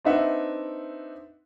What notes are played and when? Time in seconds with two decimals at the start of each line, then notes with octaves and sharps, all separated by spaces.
0.05 C4 D4 D#4 B4 E5 F#5